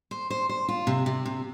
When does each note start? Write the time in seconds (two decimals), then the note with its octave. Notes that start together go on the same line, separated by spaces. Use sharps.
0.11 C5
0.30 C5
0.49 C5
0.68 F4
0.87 C3
1.06 C3
1.25 C3